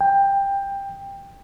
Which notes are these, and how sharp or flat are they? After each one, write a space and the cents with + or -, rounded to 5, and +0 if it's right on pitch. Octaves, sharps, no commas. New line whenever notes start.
G5 +15